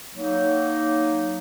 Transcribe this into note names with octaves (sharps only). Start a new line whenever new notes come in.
F#3 A#3 D#4